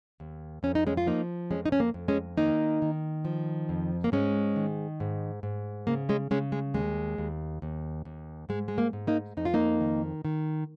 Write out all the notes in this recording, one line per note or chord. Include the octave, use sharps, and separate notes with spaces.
D#2
F2 C#4
D#4
G#3 C#4
F4
F3 A#3 D#4
F2 G#3 C#4
D#4
C#4
A#3
F2
G#3 C#4
D#3 A#3 D#4
D#3
F3
F2
A#3
G#2 G#3 C#4
D#3
G#2
G#2
C#3 A#3
G#3 C#4
C#3 G#3 C#4
G#3
D#2 G#3
D#2
D#2
D#2
G#2 G#3
G#3
A#3
G#2
A#3 D#4
F2 D#4
F4
A#3 D#4
D#3
D#3